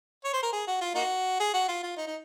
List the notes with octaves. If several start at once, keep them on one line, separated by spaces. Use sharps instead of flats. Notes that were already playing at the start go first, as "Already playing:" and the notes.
C#5
C5
A#4
G#4
F#4
F4
A#3 D#4 F#4
G#4
F#4
F4
F4
D#4
D#4